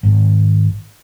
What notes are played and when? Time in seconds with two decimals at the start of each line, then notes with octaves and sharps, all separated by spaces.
0.03 G#1